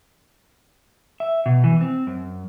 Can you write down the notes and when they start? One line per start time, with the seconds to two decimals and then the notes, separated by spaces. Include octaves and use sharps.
1.20 E5
1.46 B2
1.64 E3
1.81 C4
2.07 F#2